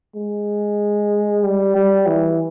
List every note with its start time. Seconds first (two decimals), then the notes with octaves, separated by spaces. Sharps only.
0.16 G#3
1.44 G3
1.76 G3
2.07 E3